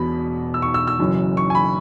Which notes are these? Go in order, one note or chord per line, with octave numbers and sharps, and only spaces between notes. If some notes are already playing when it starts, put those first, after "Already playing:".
Already playing: E1 E2 B2 B5
E6
C#6
E6
E6
F#1 F#2 E3
C#6
G#5
B5